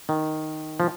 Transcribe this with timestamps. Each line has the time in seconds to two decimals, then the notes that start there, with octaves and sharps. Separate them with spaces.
0.09 D#3
0.80 F3